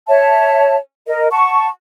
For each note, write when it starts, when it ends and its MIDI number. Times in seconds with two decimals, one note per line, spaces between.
0.08 0.75 73
0.08 0.75 76
0.08 0.75 81
1.07 1.28 70
1.07 1.28 75
1.31 1.68 78
1.31 1.68 81
1.31 1.68 85